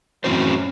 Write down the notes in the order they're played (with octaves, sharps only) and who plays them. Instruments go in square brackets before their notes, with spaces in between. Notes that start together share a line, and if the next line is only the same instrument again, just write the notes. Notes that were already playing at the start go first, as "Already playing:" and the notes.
[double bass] F#2 [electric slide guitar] A2 E3 C4 F#4 C5